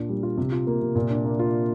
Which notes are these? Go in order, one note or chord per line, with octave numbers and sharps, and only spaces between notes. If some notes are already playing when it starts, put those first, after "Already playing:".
Already playing: A#2 D4 F4
G3
F4
C3
F4
A#3
C3
A#2
D4
A#3
F4